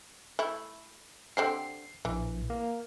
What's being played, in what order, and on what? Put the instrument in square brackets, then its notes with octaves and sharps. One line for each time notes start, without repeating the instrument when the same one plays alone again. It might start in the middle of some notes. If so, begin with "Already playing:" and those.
[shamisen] A3 E4
[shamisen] D3 C4 G4 [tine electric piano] C7
[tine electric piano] A#1 [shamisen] E3
[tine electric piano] A#3